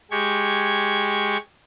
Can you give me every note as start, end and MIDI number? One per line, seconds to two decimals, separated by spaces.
0.11 1.37 56
0.11 1.37 67
0.11 1.37 85
0.11 1.37 92